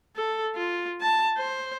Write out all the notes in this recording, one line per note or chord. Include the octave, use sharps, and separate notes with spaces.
A4
F4
A5
C5